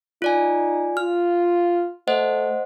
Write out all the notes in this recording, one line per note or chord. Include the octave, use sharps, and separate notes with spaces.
D#4 F4 D5 G#5
F4 F6
A3 C5 D#5 F#5